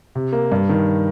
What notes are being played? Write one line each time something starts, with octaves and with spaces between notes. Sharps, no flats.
C3
A#3
G2
D#3